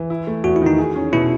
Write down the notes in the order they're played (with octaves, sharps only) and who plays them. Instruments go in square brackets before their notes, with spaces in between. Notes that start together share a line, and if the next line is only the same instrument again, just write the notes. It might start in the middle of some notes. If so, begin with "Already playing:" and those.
Already playing: [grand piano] E3
E4
A3
[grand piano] E2 [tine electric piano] F#4
[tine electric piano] E4
[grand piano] D#3 [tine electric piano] D#4
[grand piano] G#4
C#4
[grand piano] B2 [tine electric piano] E4